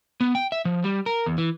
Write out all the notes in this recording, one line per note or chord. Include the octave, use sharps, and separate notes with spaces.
B3
G5
E5
F3
G3
A#4
E2
E3